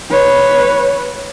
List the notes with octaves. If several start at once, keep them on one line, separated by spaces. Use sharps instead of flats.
B4 C#5